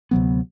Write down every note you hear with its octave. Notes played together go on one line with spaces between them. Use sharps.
D2 C3 F#3 B3